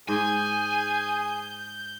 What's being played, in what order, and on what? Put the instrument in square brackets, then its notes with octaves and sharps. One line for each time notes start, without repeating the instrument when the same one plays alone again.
[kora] G#2 [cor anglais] G#4 [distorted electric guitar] G#5 [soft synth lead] G6